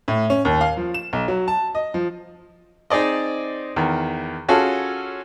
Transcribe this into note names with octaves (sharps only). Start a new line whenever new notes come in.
A2
C#4
D#2
F5
F3
E7
B1
F#3
A5
D#5
F3
C4 D#4 G#4 D5 D#5
E2 D#3
C#4 F4 F#4 G#4 A4